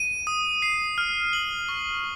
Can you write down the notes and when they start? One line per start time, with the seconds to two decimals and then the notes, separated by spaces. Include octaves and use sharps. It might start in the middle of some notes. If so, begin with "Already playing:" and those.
Already playing: D#7
0.27 D#6
0.62 C7
0.98 F6
1.33 F#7
1.69 C#6